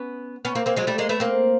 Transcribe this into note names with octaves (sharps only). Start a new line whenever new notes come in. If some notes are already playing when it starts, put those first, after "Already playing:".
Already playing: B3 C#4
B3 C#4
A#3 C4
A#3 C4
F#3 G#3
G3 A3
G#3 A#3
A3 B3
A#3 C4